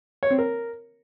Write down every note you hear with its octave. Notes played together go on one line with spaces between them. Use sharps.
C#5
C4
A#4